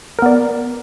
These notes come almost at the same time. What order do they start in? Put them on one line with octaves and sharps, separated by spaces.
A#4 B3 D5